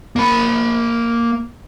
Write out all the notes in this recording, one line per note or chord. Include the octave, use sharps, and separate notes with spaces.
A#3 B5